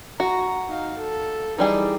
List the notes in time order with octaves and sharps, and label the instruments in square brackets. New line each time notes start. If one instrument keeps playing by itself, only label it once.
[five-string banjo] F#4 [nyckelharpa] A#5
[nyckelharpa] D#4 F5
A4
[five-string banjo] E3 G3 G#4 [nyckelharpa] D#4